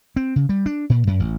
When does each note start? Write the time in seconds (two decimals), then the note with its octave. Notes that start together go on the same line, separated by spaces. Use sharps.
0.16 C4
0.36 C#3
0.49 G3
0.66 D4
0.90 A#2
1.07 F#2
1.20 A1